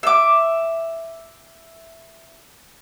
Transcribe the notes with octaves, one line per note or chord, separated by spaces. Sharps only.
E5 D6